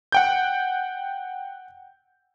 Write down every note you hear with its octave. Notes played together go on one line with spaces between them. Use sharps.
F#5 G5 G6